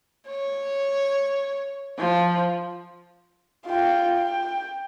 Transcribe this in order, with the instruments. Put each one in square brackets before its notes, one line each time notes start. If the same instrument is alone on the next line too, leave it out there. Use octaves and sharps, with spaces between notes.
[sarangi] C#5
F3
[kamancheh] F4 G5
G5